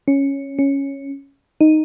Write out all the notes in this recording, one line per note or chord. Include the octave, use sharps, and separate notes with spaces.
C#4
C#4
D#4